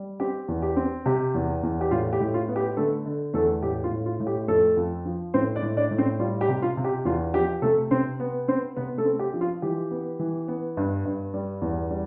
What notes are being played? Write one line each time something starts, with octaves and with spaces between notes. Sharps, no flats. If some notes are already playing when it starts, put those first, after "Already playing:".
Already playing: G3
C4 G4
E2
G4
C4
C3 G4
E2
E2
G4
A2 F4
G4
A2
F4
B3
G4
D3 A3 A4
D3
E2 A3 A4
A2 G4
F4
A2
F4
A2
G4
F2 A3 A4
F2
F3
A2 C4 C5
D4 D5
A2
D4 D5
A2
C4 C5
G3 F4
G4
C3
F4
C3
G4
E2 F4
F3 G4
C3 A3 A4
C3 C4 C5
B3
B3 C4 C5
C3 B3 B4
A3 A4
C4
G4
F3
F4
E3 G4
B3
E3
B3
G2
G2
G3
E2
G3